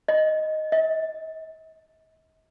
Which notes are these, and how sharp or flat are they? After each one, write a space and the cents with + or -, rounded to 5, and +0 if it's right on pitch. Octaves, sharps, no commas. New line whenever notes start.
D#5 +0
D#5 +45